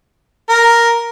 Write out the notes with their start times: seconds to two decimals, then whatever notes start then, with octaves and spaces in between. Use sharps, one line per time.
0.50 A#4